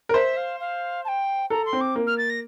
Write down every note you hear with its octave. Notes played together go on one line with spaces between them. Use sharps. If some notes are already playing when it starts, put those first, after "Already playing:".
A#4
C5 E5
F5
F5
A5
G5
A4 A#5
C6
C4
D6
A#3
F6
A6
A#6